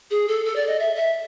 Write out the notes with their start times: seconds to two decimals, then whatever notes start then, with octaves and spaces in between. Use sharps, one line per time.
0.11 G#4
0.28 A4
0.45 A4
0.56 D5
0.67 D#5
0.79 E5
0.96 E5